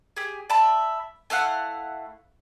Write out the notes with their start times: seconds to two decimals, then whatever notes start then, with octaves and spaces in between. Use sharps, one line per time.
0.17 G4 G#4
0.50 D5 E5 A5 B5
1.30 A3 E4 F5 F#5